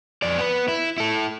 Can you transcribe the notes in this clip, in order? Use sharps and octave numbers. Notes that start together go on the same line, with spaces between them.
F2 D5
B3 B4
E4
E4 A4